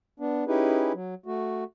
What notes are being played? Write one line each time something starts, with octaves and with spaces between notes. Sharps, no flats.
B3 D4
C#4 D#4 E4 G4 G#4 B4
F#3
A3 F#4